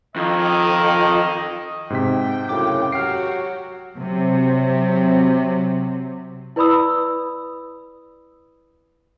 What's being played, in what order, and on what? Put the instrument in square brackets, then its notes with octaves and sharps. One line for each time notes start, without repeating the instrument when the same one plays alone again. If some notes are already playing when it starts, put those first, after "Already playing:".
[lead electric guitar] F2 [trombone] D#3 [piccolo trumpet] D#5
[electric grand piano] G#2 C3 B6 [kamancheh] G5
[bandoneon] F#2 A2 C#3 [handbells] D6
[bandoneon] F#3 [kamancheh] F#4 G4 [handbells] F6 D7 [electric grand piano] C7
[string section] C3 F#3
[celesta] E4 B4 D5 B5 D#6 E6